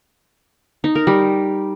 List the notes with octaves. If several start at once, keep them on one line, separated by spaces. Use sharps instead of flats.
D#4
A#4
G3